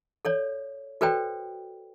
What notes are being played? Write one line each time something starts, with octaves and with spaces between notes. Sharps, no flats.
A4 C#5 D5
F#4 A4 B4 C5 D5 G5